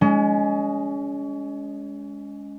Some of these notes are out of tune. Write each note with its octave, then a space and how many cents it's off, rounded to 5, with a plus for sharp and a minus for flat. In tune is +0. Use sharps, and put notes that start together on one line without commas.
G#3 +0 C#4 +35